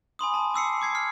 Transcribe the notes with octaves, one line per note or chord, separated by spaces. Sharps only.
G#5 B5 C6 D#6
A5 B5
D6 E6 C7 C#7
D6 G#6 C7
F6 C7